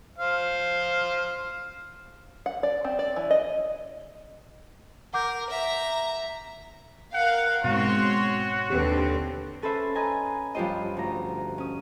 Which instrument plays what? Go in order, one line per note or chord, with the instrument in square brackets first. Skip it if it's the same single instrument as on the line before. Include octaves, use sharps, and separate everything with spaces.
[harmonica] C5 F5
[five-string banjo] F#5
D5
C4
D5
E3
D#5
[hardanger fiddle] A#4 [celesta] F#5 D6 G6
[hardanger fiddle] E5 A#5
[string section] A#4 F5 [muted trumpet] F#5
[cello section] G#2 C4 [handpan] B2 [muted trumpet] F#4 [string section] C#5 C6
[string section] D#2 D3 [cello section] C4 [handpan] G4 B4
[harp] C#4 A4 B4 C5 E5
B4 D#5 G#5 A#5
G2 F3 F4 G4 C5 D#5
D2 A#5
C#4 D#6